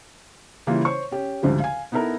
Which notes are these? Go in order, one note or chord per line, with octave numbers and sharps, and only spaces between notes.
C#3 E3 G3 A#3 E4 F4
C5 C#5 C#6
C#4 G4
D2 G#2 D3 F3 G3
F5 G#5
B3 D#4 E4 A4 A#4